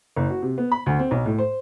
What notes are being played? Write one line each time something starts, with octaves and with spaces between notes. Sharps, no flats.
F#1
F#4
C3
B3
B5
D2
C4
B1
A2
C5